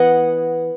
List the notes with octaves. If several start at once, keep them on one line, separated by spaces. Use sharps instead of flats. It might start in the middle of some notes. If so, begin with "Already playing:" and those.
Already playing: E3 B3 D#5 F#5 G#5